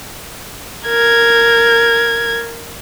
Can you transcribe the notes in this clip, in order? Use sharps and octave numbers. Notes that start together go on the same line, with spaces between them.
A#4 G#6